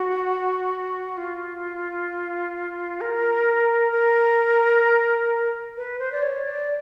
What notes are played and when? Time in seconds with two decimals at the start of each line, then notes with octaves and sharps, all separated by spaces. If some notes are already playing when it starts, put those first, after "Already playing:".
Already playing: F#4
1.17 F4
3.01 A#4
3.92 A#4
5.77 B4
5.99 C5
6.12 D5
6.23 C#5
6.45 D5